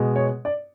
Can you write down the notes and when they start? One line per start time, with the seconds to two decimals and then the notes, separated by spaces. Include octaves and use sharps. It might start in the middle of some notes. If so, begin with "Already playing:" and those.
Already playing: B2 G#3
0.16 C#5
0.45 D5